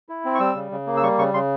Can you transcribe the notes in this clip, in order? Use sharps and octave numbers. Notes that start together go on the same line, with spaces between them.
E4
C4
C#6
G3 E6
C#3
C#3
A#3
E6
G3 C#6
C#3 C#6
C#3 C6